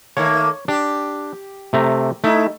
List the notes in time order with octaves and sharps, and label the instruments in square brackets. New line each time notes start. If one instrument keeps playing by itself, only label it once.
[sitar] D#3 A3 A#3 [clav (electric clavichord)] C#5
[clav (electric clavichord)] D4 [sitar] G4
[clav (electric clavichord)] C3 A3 A#5
[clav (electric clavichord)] A3 [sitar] D#4 E4